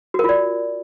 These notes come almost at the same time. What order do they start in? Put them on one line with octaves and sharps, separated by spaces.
F#4 A#4 F4 D5